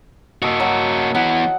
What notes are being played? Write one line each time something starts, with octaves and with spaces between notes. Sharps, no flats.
A#3 F#4 A4 D#5
F#3
E3 B3 F#5